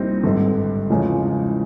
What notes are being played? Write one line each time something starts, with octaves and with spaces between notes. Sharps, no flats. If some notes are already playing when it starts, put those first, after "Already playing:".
Already playing: C2 A#2 G3 C4 D#4
G#1 G2 D3
E2 C#3 F3 G#3 C#4